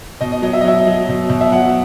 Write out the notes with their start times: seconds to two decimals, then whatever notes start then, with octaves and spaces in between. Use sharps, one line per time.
0.21 B2 D#5
0.32 D#5
0.42 F#3 D#5
0.53 E5
0.61 D#5
0.64 F#3 E5
0.87 F#3
1.09 B2
1.30 B2
1.41 E5
1.52 F#3 F#5